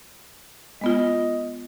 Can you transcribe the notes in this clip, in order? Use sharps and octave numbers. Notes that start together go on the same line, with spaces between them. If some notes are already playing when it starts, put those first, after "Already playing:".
G#3 B3 F4 D#5